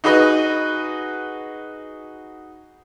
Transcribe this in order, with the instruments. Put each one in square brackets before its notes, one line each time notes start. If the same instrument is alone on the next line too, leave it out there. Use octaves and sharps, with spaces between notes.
[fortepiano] D#4 F#4 G#4 B4 D#5